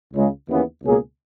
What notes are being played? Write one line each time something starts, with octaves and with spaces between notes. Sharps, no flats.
C#2 C#3 G#3
D#2 C#3 E3 B3
C#2 B2 A#3 C#4 G#4